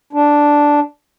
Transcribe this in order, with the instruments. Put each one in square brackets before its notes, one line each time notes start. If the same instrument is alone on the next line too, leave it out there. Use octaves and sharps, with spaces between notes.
[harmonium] D4